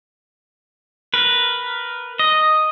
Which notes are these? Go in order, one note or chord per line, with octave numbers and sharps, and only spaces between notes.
A#4 B4
D#5